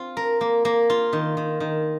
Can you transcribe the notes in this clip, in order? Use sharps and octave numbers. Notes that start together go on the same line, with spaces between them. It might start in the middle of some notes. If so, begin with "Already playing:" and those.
Already playing: C4 F4
A#4
A#3
A#3
F4
D#3
D#3
D#3